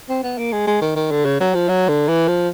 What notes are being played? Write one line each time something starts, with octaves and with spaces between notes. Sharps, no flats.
C4
B3
A#3
G#3
G#3
D#3
D#3
D3
C#3
F#3
F3
F#3
D3
E3
F3